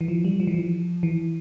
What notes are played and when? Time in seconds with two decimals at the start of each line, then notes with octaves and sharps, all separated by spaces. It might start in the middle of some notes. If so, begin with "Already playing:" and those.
0.01 E3
0.08 F3
0.25 G3
0.40 F3
0.47 E3
0.54 F3
1.03 E3